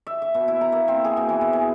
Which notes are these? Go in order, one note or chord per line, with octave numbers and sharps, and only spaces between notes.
E5
E5
B2
E4
A#5
A#3
C4
G#4
B2
E3
E3
G#4